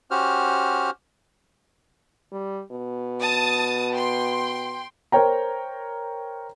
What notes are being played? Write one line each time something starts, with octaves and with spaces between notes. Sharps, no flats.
C#4 F#4 G4 C5 F6
G3
B2
A5 D#6 A6
G5 C6
A#4 C5 C#5 G5 A#5